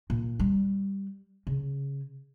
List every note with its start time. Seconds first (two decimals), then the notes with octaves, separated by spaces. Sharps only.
0.10 A#2
0.39 G3
1.47 C#3